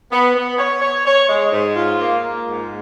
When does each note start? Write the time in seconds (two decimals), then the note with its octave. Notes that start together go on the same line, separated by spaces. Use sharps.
0.12 B3
0.36 B3
0.58 C#5
0.82 C#5
1.06 C#5
1.29 G#3
1.52 G#2
1.76 F4
2.00 A#3
2.23 A#3
2.46 G#2